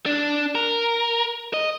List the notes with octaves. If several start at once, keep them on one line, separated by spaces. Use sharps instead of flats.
D4
A#4
D#5